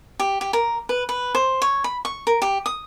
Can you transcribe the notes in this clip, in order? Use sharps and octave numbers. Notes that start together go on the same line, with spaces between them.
G4
G4
A#4
B4
B4
C5
C#5
B5
C#6
A#4
G4
D#6